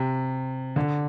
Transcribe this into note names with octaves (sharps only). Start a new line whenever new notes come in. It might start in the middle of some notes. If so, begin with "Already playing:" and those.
Already playing: C3
D3